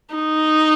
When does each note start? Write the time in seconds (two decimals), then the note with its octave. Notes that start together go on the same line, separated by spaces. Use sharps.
0.15 D#4